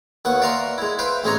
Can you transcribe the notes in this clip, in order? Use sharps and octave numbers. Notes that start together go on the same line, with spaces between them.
D#2 B3 F#5 C#6
D5 E5 F5 A#5 C6 C#6
G#3 E4
B4 C5 E5 F5 G5
A1 G#3 C4 G#4 C#5 A#5